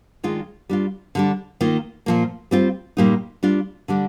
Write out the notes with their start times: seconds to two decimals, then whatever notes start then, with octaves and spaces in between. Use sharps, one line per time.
0.24 D#3 G#3 D4 F4
0.69 G3 D4 F4
1.15 D3 G3 D4
1.61 D#3 A#3 F4
2.06 A#2 F3 A#3
2.51 G3 C4 F4
2.97 A#2 G3 A#3 D#4
3.43 G3 D4 F4
3.88 D3 G3 D4